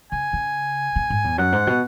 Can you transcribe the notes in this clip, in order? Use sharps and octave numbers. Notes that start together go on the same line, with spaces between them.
C#3 G#5
C#3
B2
G#2
E2
F#2 F#5
G#2
B2